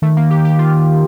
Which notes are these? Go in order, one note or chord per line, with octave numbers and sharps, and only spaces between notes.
D#3 A3
A#3
G4
G4
F4